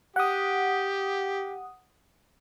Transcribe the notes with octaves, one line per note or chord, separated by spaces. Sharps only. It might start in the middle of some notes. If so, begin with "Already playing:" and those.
G4 F#5 D#6